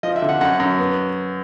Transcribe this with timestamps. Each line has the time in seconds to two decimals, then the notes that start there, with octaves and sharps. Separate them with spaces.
0.03 F3 D#5
0.16 E5
0.22 D3
0.29 F#5
0.41 F#2 F#5
0.60 F#2
0.78 B3